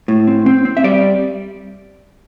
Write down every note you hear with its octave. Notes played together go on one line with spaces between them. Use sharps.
A2
C4
C4
C4
E5
G3 D5